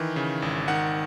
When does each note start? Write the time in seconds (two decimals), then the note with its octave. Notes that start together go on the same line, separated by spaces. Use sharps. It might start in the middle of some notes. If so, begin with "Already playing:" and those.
Already playing: D#3 E3
0.16 C#3
0.42 G#1
0.68 D#3 F#5